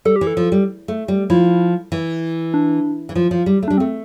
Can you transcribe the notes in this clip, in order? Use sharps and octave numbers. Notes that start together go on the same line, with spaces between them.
G3 A4
G4
E3
A4
F3
G3
A3
G3
F3 E4
E3
D4
E3
F3
F3
G3
A3
G3 D4
C4
A3